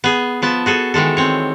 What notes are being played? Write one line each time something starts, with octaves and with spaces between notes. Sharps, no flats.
B3 G#4
F3 B3 A5
F#4 G#4 A4
D#3 E3 G#3 A4
C4 C#5